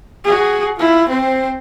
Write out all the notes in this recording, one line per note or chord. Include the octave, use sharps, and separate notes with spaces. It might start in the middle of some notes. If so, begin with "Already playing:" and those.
F#4 G#4
E4 F4
C4 C5